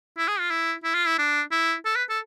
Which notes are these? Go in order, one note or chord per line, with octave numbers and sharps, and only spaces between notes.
E4
G#4
F4
E4
E4
F4
E4
D4
E4
A4
B4
A4